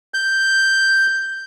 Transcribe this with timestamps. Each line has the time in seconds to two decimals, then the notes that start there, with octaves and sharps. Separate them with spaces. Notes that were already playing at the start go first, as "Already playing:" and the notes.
0.14 G6